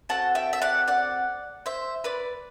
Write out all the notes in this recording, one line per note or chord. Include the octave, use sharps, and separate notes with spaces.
C4 F#4 A4 F#5 A5
E5 G5
E5
D5 F#5
D5 F#5
C5 E5
B4 D5